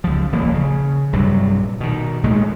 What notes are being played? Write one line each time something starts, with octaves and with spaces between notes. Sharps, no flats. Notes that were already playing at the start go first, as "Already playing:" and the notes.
C#2 F3
D#1 A1 F3 A#3
C#3
A#1 G2 C3 F#3
B2 D#3
A#1 A2 G#3 A3